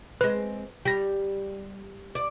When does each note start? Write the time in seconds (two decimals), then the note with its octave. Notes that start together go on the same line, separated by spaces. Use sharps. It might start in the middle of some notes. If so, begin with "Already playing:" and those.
0.21 G#3 C4 B4
0.85 G3 G5 A#6
2.15 D5